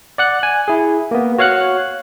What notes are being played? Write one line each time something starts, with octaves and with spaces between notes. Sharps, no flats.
D5 F#5 F#6
G#5
E4 G#4
A#3 B3
F#4 C#5 F5 F#5 F#6